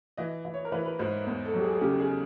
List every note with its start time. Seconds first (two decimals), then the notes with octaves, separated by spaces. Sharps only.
0.17 E3 D#5
0.45 E3
0.54 C#5
0.65 A#4
0.72 E3 B4
0.86 B4
0.99 G#2 C5
1.27 E2 C5
1.45 A4
1.54 F#3 G4
1.64 G#4
1.75 G#4
1.81 C#3 G4
2.00 G#4